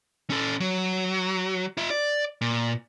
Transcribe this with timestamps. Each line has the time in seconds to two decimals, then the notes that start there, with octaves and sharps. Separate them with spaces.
0.30 C#4 A4
0.60 F#3
1.77 F4 E5
1.90 D5
2.41 A#2